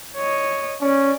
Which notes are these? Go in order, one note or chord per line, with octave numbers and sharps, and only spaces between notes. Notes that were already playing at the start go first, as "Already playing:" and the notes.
C#5 D#5
C#4 D5